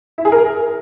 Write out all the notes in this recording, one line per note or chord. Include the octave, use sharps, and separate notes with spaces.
E4
G#4
A#4